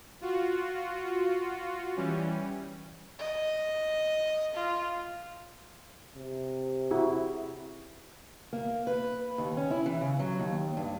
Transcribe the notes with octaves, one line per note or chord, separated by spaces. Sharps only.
F4 F#4
E3 G3 C#4
D#5
F4
C3
E4 F#4 G#4
A#3
B4
D#2
C#4
E4
E3
C#3
F#3
D#2
G2